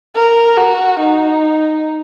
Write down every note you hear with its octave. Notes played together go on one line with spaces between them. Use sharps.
A#4
F#4
D#4